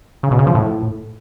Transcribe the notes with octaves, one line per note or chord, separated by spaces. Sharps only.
C#3
B2
C#3
F3
A2